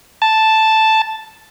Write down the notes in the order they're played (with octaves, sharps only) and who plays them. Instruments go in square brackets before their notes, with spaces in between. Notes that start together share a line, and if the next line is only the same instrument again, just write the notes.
[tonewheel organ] A5